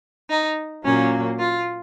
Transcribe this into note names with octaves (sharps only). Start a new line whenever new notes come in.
D#4
A#2 F#3 A#3 C#4
F4